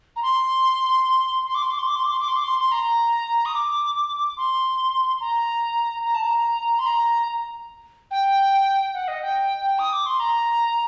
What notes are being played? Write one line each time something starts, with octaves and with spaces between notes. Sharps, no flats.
A#5
C6
C6
D6
C6
D6
C6
D6
C6
D6
C6
D6
C6
D6
C6
C6
A#5
D#6
D6
C6
A#5
A#5
A5
A#5
C6
A#5
G5
F#5
D#5
G5
D#6
D6
C6
A#5